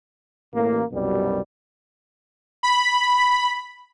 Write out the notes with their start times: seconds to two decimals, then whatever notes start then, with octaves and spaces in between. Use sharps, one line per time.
0.53 A1 A#3
0.92 C2 F#2 B2 G3
2.63 B5